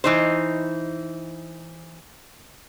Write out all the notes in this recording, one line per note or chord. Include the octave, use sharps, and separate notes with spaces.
E3 D#4 C5